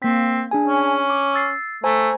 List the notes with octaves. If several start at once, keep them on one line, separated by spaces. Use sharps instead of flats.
A#3 C4 B6
D4 G#4 G#5
C#4
D6
E6 A6 C7
A3 C5 G#5 A#5